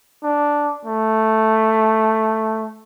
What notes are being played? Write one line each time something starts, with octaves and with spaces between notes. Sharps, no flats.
D4
A3